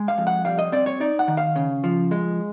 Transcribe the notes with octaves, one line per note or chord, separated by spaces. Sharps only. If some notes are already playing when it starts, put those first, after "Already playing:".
Already playing: G#3
F5
F2
F#5
G3 F5
D#5
C4 D5
C#5
D#4 D5
F#5
D#3
F5
C#3
F3
G#3